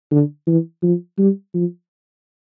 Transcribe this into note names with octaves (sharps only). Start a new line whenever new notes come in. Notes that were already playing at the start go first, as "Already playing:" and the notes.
D3
E3
F3
G3
F3